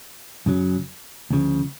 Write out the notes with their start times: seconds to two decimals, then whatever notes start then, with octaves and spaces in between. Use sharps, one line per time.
0.46 F#2 C#3 F#3
1.30 D2 C#3 F3